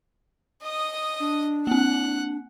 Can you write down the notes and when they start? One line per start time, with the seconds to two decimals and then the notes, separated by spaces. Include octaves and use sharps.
0.63 D#5 D#6
1.20 D4
1.67 A#3 C4 F#5 F#6